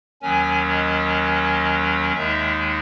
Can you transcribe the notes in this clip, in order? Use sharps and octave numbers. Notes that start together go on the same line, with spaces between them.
D#2 D#3 F#3 C#4 G#5
D#5
D#2 D#3 G#3 D#4 E5